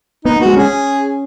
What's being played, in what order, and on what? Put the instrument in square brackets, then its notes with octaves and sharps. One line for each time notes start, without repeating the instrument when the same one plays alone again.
[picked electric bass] B3 [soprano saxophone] D#4
[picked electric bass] B3
[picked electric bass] G#3 [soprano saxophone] F#4
[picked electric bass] C#4 [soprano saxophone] G#4